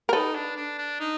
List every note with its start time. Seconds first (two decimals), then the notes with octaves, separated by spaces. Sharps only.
0.09 A#4
0.13 D#4 A4 B4
0.35 D4
0.56 D4
0.78 D4
1.00 D#4